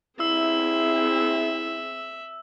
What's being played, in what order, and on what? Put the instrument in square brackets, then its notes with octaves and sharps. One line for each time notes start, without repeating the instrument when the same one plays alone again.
[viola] C4 G#4 [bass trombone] E4 [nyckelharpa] E5 [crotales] E6